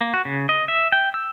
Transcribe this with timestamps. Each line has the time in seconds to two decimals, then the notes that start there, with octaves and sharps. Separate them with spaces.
0.01 A#3
0.14 F#4
0.25 C#3
0.49 D#5
0.68 E5
0.92 G5
1.14 E6